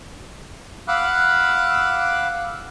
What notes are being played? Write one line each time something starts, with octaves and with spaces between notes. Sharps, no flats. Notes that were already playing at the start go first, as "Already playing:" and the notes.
F5 F#5 B5 D6 E6 F#6